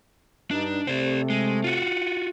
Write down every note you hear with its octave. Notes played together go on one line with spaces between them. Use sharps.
G2 D4 D#4
C3 A3 C5 D5
G#3
F4 F#4